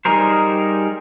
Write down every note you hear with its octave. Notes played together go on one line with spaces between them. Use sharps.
G3 D#4 G#4 A#4 C5